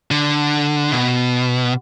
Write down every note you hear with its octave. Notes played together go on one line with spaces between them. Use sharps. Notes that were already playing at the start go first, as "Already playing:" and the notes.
D3
B2